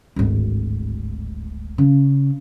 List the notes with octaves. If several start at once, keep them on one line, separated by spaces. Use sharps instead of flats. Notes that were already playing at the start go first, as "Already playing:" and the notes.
D1 G#1
C#3